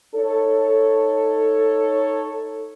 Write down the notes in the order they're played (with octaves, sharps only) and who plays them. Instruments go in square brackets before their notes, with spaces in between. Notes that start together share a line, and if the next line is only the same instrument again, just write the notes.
[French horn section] D#4 A4 C#5